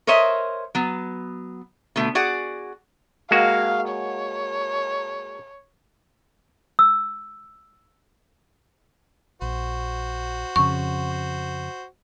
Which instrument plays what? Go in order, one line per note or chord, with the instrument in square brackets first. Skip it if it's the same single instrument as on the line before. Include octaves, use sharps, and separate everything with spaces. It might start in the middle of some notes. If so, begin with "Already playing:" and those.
[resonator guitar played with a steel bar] A#4 C5 C#5 D#5 E5
F#3 B3
B2 D3 A3
F#4 G#4 D5 F#5
[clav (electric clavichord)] G#3 A#3 F#4 [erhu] F5
[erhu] C#5
[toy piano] E6
[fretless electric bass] A#1 [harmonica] F#4 C5
[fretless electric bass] F2 C#3 [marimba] C#6